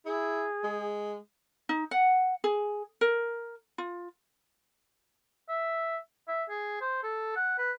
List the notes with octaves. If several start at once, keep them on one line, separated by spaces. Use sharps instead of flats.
E4 G#4
G#3
D#4
F#5
G#4
A#4
F4
E5
E5
G#4
C5
A4
F#5
B4